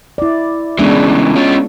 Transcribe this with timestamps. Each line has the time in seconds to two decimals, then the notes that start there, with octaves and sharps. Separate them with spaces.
0.18 E4 D5
0.79 C#3 E3 G#3 B3 D4
1.35 C#4 F4